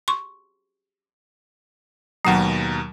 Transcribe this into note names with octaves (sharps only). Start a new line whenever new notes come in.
C6 C#6
D#2 B2 F#3 F#5 A#5